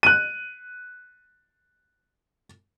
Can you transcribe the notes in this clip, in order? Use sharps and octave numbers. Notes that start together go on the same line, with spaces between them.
F#6 D#7